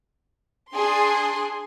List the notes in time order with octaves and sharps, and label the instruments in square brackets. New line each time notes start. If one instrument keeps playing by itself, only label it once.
[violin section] D4 G#4 C6